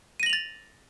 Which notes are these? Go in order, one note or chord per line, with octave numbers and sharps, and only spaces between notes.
A6 A#6 D#7 F7 F#7